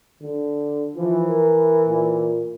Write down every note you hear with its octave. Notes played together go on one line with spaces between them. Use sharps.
D3
E3 F3
A#4
A#2